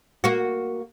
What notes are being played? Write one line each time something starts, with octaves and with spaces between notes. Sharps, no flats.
A#3 F#4